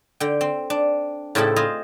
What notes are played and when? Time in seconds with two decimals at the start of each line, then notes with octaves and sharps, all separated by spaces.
0.20 D3 G5
0.41 C4
0.70 D4
1.35 A2 C#3 C4 E4 A4 B5
1.56 F4 G#4 C5 D#5